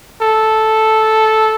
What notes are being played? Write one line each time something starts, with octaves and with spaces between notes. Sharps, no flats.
A4